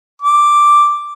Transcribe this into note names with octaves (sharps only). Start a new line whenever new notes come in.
D6